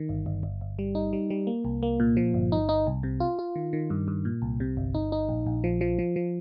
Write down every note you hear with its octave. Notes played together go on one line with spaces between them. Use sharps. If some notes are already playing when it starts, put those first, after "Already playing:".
Already playing: D#3
G1
G1
G1
G1
G3
D#4
G3
G3
A#3
C2
A#3
A#2
F3
G1
D#4
D#4
C2
C3
F4
F4
D#3
D#3
G2
G2
A#2
C2
C3
G1
D#4
D#4
A#1
A#1
F3
F3
F3
F3